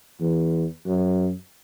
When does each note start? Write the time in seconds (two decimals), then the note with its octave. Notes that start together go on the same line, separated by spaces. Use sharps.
0.20 E2
0.86 F#2